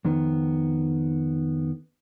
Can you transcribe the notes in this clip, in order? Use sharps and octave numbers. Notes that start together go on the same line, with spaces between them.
F2 D#3 B3